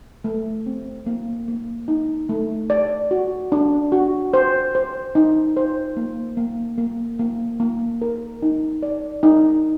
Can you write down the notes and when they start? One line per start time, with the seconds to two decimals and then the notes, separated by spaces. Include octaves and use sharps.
0.24 A3
0.66 C4
1.06 A#3
1.48 A#3
1.88 D#4
2.29 A3
2.70 D5
3.11 F#4
3.52 D4
3.92 F#4
4.34 C5
4.75 C5
5.15 D#4
5.57 C5
5.97 A#3
6.37 A#3
6.78 A#3
7.19 A#3
7.60 A#3
8.02 A#4
8.42 D#4
8.83 D5
9.23 D#4